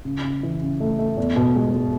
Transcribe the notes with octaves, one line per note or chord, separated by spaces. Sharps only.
C#3
C#3
E3
C#3
A3
A3
E2
B2
G#3
G#3